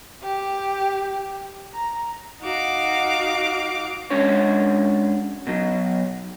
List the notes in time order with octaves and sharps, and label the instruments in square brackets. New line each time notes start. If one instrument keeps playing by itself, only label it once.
[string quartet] G4
A#5
D#4 F#4 F5 D6
[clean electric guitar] G#3 C#4 D4 F#4 C#5
B2 F#3